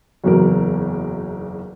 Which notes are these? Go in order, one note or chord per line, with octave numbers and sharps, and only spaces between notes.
F#1 B1 E2 A#4